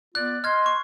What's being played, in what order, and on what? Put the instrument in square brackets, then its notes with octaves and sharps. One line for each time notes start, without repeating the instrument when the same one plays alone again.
[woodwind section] B3 F4 D5 [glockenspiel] F#6
[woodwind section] D#5 C6 [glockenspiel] F6 G#6
[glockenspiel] C#6